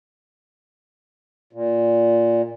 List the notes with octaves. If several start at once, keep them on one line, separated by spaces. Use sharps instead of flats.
A#2